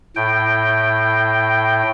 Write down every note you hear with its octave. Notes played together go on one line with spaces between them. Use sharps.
A2 G5